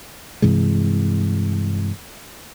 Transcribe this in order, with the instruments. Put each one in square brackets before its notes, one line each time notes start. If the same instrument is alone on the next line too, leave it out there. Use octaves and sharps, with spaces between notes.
[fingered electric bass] G2 C3 E3 G#3